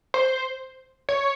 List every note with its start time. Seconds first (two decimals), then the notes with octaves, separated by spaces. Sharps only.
0.14 C5
1.09 C#5